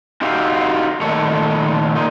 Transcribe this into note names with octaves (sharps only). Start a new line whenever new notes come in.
D#4 F#4 G4 E5 F5
A#2 D#3 A3 A4 C#5
A#2 D#4